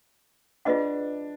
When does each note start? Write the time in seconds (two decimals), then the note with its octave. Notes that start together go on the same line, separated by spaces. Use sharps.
0.65 D4 F4 G#4 B4 D#5 F#5